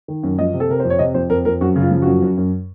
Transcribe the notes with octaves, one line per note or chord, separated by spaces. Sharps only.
D#3
F#2
F3 D#5
C3
A4
C3 A#4
F2 C5
C#5
C3 D#5
F2 C5
F2 A#4
F2 A#4
F#2 F#4
C#3
F4
F3
F#2 F#4
F#2
F#2